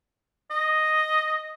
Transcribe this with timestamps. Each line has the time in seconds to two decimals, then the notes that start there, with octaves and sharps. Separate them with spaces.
0.51 D#5